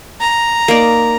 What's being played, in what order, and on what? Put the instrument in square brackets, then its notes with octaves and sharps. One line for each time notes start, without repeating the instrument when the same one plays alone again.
[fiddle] A#5
[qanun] A#3 D#4 D5